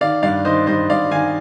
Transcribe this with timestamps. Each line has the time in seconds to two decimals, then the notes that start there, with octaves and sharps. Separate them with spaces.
0.01 D#3 D5 F5
0.23 G2 D5 F5
0.45 D#3 C5 D#5
0.67 G2 C5 D#5
0.90 G2 D5 F5
1.11 D#3 F5 G#5